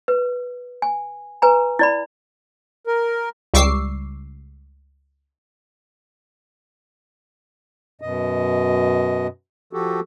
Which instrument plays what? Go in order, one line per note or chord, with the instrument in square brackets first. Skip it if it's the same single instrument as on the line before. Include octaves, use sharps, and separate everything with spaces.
[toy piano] B4
G#5
B4 G#5 A#5
E4 D5 B5
[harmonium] A#4
[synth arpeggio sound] C#2 G3 C#6 D6 E6 C7
[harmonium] F#2 B2 D#5
F3 F#4 G4 A4